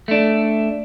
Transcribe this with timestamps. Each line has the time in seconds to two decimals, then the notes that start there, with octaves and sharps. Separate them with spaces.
0.08 A3 D4